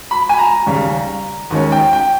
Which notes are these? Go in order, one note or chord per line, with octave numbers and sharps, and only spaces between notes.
B5
G#5
A#5
D#2 C#3 G3
D#2 D#3 G#3 C#4
G5
G5